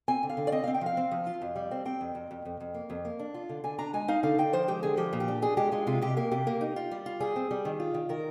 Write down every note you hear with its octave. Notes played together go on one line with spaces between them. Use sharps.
C4 G#5
D3
F5
D3
D5
C4 D#5
C4 F5
G5
F3 F5
C4
F3
F4
F2
G3
C4
C4 G5
F2
F2
F2
F2
F2
A#3
F2
A#3
D4
F4
D3
D3 G#5
D4 A#5
G#3 G#5
D#4 F5
D3 F5
D3 G5
F3 C5
G#3 G4
D3 G#4
F3 G4
A#2
G4
D4
D4 G#4
G#3 G4
G#3 F4
C3 F4
C3 G4
A#3 G4
C3 G4
A#3
D#4
F4
G3
F4
G3 G#4
C4
G3
D#3
F4
D#3
D#3 A#4